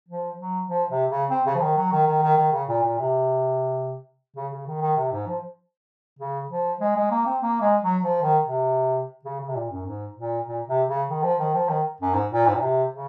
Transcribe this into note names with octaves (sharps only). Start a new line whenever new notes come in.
F3
F#3
F3
C3
C#3
C4
C#3
F3
D#3
F#3
D#3
D#3
D#3
D#3
C#3
A#2
A#2
C3
C#3
C#3
D#3
D#3
C3
G#2
F3
C#3
F3
G#3
G#3
A#3
C4
A#3
G#3
F#3
F3
D#3
C3
C#3
C#3
C3
A#2
F#2
G#2
A#2
A#2
C3
C#3
D#3
F3
D#3
F3
D#3
F#2
G#2
A#2
G#2
A#2
C3
C#3